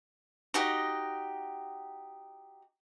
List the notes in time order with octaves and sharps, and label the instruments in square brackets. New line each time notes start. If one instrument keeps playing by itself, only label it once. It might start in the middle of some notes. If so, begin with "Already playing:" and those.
[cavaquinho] D#4 F#4 G4 D#5